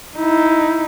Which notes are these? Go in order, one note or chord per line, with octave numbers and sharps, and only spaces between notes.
D#4 E4